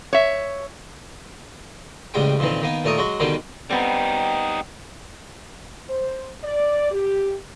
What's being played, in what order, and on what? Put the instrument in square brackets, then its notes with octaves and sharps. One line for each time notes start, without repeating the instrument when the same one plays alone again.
[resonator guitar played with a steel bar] C#5 E5
[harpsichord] A1 C#3 G3 G#3 G5
F2 A#2 D#3 E3
D#3 A#3 B3
D#2 A#2 A3 A#4 C#6 D#6
F#3 G#3 F#4
B2 D3 D#3 G3 A#3
[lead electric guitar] G3 D#4 [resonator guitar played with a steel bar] B3 C4 [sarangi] G5
[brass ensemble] C5
D5
G4